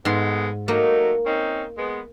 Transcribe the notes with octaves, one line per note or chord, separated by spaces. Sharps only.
G#2 G#3 A3 B3 C6
F#3 A3 A#3 D#4
C4 C#4 D#4
G#3 B3